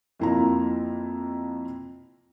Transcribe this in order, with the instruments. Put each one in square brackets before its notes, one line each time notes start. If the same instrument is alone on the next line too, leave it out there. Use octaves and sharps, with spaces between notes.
[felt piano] F2 A#3 E4 F4 A#5